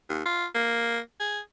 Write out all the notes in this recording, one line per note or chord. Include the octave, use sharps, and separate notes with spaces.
D#2
F4
A#3
G#4